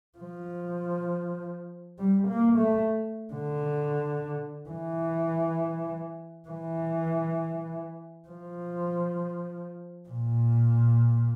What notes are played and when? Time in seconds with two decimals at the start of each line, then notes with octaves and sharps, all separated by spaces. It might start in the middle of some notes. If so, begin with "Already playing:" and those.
0.18 F3
1.99 G3
2.28 A#3
2.59 A3
3.34 D3
4.69 E3
6.49 E3
8.29 F3
10.09 A#2